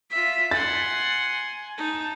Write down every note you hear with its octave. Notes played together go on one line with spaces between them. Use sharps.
F4 E5 B6
F#5 G#5 C6 A6
D#4 A5